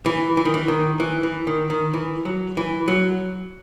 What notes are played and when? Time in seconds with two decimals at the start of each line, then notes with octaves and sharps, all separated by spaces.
0.06 E3
0.37 E3
0.45 D#3
0.54 E3
0.68 D#3
1.00 E3
1.23 E3
1.47 D#3
1.70 D#3
1.94 E3
2.25 F#3
2.57 E3
2.88 F#3